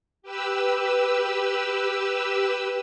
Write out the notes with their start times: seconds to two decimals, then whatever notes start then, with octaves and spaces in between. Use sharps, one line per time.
0.22 G4 B4 E6